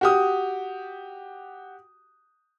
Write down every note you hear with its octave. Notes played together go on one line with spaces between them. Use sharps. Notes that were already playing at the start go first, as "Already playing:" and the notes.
F#4 G4 D#6